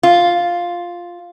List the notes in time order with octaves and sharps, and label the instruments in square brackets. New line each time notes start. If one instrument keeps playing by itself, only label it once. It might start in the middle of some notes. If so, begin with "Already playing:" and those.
[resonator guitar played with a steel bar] F4